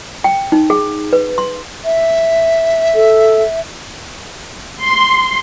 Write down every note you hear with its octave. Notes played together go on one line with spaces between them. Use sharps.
G5
D#4
G#4
B4
C6
E5
A4
C6